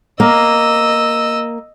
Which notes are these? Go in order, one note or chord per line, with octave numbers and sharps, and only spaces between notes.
A#3 D#5 E6